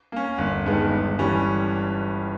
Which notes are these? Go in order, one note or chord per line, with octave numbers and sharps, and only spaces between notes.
A#3 C#4
G1
G2 D#3 G#3 B3
G1
G2 E3 G3 C#4